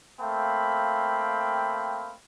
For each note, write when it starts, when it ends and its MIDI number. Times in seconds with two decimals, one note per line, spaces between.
0.20 2.14 57
0.20 2.14 58
0.20 2.14 60
0.20 2.14 77
0.20 2.14 79
0.20 2.14 83